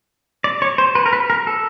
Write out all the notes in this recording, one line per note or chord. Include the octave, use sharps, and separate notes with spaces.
D5
C#5
C5
B4
A#4
B4
A#4
A4